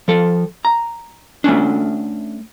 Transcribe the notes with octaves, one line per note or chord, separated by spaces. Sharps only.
F3 A4
A#5
A3 A#3 C#4 D4